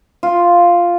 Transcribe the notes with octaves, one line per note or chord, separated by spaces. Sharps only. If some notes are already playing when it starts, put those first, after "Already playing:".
F4